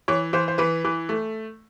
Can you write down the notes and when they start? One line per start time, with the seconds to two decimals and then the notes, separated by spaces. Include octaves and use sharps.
0.08 E3 C#5
0.33 E3 C5
0.48 C5
0.58 E3 B4
0.85 E3
1.09 A3